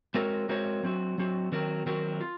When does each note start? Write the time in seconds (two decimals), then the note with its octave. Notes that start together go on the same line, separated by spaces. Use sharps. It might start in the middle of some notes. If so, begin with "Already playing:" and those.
0.14 G#3 C4 F#4 A#4 C#5
0.49 G#3 C4 F#4 A#4 C#5
0.83 F#3 C4 F#4
1.18 F#3 C4 F#4
1.52 D#3 F#3 C4 F#4 A#4
1.86 D#3 F#3 C4 F#4 A#4
2.21 F4